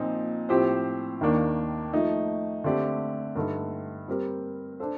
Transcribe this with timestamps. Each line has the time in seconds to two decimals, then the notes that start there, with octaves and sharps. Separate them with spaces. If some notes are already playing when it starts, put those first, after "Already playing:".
Already playing: A#2 F3 C4 D#4
0.49 A2 F3 C4 G4 C5
1.21 D#2 D#3 A#3 D4
1.93 F3 A3 D#4
2.64 D3 A3 C4 G4 D5
3.35 G2 D3 A3 D#4 A4
4.08 G3 C4 G4 A#4
4.80 D4 A4 C5